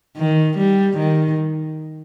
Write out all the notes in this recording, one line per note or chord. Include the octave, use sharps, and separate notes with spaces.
D#3
G3
D#3